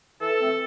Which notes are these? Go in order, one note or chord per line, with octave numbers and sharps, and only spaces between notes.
E3 A4
A3 C4